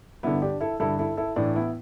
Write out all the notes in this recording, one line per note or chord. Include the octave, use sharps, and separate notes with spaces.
G2 D3 B3 E4
D4 G4
E4 A4
G2 D3 E4 A4
E4 A4
E4 A4
A2 E3 D4
B3 E4